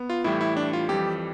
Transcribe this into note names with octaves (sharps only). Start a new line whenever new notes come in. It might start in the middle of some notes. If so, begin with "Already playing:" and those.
Already playing: B3
F4
A2 E3 G3 E4
E4
D4
F4
F2 E3 G3 G4